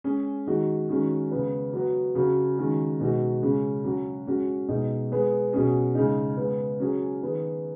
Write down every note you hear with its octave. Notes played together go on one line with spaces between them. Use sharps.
G#3 C#4 G#4
D#3 G#3 D#4 F#4
D#3 G#3 C#4 F#4
C#3 G#3 B3
F#3 B3 F#4
C#3 F#3 C#4 F#4
D#3 G#3 C#4 F#4
B2 G#3 D#4 F#4
C#3 G#3 C#4
F#3 C#4 F#4
G#3 C#4 F#4
B2 G#3 D#4
G#3 B3 G#4
B2 F#3 C#4 G#4
C#3 G#3 D#4
C#3 G#3 B3
F#3 C#4 G#4
D#3 B3 G#4